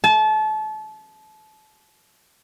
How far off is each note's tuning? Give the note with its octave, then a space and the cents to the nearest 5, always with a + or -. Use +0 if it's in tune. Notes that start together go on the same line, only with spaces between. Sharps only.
A5 -30